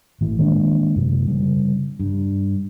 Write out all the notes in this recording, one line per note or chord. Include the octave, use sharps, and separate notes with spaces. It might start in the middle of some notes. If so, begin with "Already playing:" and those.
G#1 A2 E3
D#3 G#3 A#3 D4
F#2 C3
C#3 G3
G2